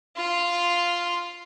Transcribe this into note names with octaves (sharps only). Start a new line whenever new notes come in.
F4 C6